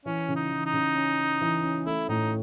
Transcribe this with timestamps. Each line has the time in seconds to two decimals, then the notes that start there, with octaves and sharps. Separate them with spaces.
0.05 E3 C#4
0.28 C#3
0.36 D#4
0.50 E3
0.66 D#4
0.73 C#3
0.95 C#4
1.18 C#4
1.41 E3
1.63 C#4
1.86 A3 E4
2.08 A2 D#4